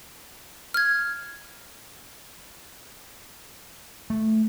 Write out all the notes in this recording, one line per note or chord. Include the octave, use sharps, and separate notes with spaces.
F6 G#6
A3